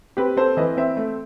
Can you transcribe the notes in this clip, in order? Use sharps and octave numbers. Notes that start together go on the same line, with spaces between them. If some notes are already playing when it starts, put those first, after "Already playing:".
C4 G4 B4
C4 A4 C5
E3 B4 D#5
C4 C5 E5
A3